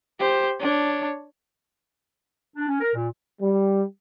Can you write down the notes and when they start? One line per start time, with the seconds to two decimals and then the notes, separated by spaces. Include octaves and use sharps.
0.19 G4 C5
0.60 D4 C#5
2.56 D4
2.68 C#4
2.81 A#4
2.95 A#2
3.40 G3